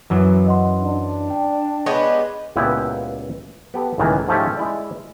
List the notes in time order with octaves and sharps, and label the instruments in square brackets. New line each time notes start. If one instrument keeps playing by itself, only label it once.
[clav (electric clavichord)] F#2 E3 F#3
[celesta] D#5 F#5 C6
[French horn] D4
[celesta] G5
[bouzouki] G#3 B3 G4 [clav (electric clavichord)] C#5
[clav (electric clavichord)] C#2 A#2 B3 E4 G4
B3 G4 A4
C#2 A2 D#3 E3 A#3
G#2 F3 A3 C#4 G4
G#3 E4 D5